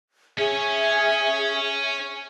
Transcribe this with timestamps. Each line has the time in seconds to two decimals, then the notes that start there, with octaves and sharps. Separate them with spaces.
0.38 C#4 G#4 C#5 E5